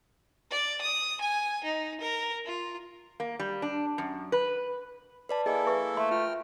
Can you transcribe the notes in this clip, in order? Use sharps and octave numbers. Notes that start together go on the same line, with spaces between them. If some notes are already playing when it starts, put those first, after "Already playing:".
D5
D#6
G#5
D#4
A#4
F4
A#3
G3
D4
F#2
B4
B4 D5 A5 B5
A#3 E4 G#4 A4 D#5 G#5
B4 E5 C#6
A3 E5 C6
F4 G5 F6